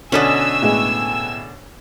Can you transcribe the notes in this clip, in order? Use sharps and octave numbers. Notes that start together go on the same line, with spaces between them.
B2 D3 C#4 D4 B4 D#5 G#5 E6
A2 G#3 B3